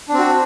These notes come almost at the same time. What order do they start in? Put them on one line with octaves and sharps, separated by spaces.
D4 C4 F#4